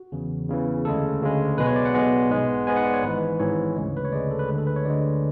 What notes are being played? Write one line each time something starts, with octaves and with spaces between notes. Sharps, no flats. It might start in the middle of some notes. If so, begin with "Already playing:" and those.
Already playing: F#4
E2 C#3 E3
E2 C#3 E3
D2 C#3 G#3 A4
D2 C#3 G#3
B1 B2 G#3 B3 B4
C#5
D5
F#5
B1 B2 G#3 B3
G#2 G#3 B3
G#2 G#3 B3 G#5
F#5
D5
C#5
G#1 G#2 E3 B4
G#1 G#2 E3 C#5
D2 C#3 G#3
B4
C#5
D2 C#3 G#3 D5
A4
B4
D2 D3 G#3 G#4
A4
B4
C#5
D2 D3 G#3 D5